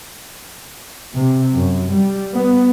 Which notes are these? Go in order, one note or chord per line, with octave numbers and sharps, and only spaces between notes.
C3
F#2
G3
B3